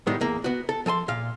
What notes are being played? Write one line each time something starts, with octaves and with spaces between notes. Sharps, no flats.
A2 D#3 G3 G#3 B3
E2 A#3
B3 F#4
A4
F3 A4 G#5 C6
A#2 F5